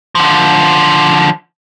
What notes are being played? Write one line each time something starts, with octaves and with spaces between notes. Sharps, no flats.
D3 F3